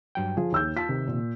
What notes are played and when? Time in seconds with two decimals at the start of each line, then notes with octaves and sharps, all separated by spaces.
0.15 G2 F#3 G5
0.37 F3 G#4
0.52 D#2 E6 G6
0.77 F4 A5 B6
0.89 C3 D#3
1.07 A#2